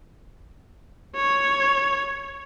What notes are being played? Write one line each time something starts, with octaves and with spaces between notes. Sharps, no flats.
C#5